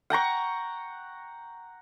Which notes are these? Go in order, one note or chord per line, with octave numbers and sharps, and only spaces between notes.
F#5 G5 A#5 C#6